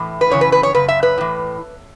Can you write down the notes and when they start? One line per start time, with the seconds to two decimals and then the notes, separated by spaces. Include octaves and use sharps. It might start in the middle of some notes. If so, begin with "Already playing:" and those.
Already playing: A2 E3
0.21 B4
0.30 F#2 C#3 E3 C#5
0.41 B4
0.52 B4
0.63 C#5
0.75 F#2 C#3 B4
0.88 E5
1.03 B4
1.18 A2 E3